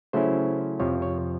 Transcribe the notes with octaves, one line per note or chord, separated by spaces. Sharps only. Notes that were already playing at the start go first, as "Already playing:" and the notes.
C#3 F#3 A3 C#4 E4 C5
F2 C3 F3 C#5
C#5